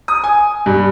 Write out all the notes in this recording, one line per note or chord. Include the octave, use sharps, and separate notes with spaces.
D#6
G#5
G2